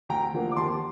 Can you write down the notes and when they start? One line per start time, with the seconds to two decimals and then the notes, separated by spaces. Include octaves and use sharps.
0.09 D2 G5 A#5
0.34 D3 F3 A#3
0.52 D6
0.56 D#2 A5 C6